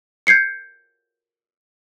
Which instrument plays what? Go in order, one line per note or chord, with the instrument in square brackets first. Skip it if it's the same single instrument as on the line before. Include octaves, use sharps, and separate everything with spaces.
[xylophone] G6 G#6 C7 C#7